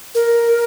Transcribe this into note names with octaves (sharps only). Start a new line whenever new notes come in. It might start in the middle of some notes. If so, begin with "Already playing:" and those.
A#4